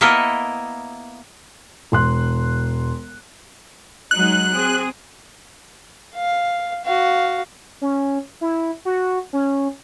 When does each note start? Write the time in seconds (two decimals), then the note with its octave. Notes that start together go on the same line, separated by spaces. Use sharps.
0.01 A#3 B3 E4 A4 A#4 D#5
1.92 E1 C6 F#6
4.11 F#3 G#3 D#4 F#6
4.51 C4 G#4
6.15 F5
6.85 F#4 F5
7.81 C#4
8.41 E4
8.85 F#4
9.33 C#4